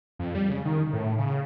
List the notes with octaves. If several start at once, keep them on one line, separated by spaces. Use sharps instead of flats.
F2
G3
C#3
D#3
A2
C#3